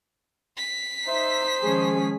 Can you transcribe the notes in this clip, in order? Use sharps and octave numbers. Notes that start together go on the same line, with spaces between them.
B6 C7
D#4 C5 E5
D#3 F3 G#3 C#4 G#4